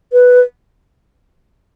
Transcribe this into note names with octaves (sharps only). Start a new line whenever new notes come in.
B4